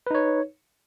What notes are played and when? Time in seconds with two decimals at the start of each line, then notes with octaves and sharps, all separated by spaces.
0.07 B4
0.11 D#4
0.15 C#5